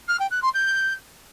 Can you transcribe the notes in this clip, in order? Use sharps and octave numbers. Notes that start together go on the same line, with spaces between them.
F6
G5
F#6
C6
G6